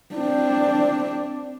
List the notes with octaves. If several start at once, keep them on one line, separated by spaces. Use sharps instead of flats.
C4 D4